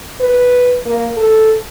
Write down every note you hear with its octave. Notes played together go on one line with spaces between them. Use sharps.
B4
A#3
A4